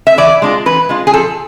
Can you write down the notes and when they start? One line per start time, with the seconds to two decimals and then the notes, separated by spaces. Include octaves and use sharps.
0.07 E5
0.18 E3 D5
0.42 G#3 D4 F4
0.66 E3 B4
0.89 G#3 D4 F4
1.07 G#4
1.13 F3 A4